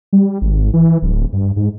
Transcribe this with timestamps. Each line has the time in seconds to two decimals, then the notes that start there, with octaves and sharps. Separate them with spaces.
0.13 G3
0.42 G#1
0.73 E3
1.02 D1
1.33 G2
1.56 G#2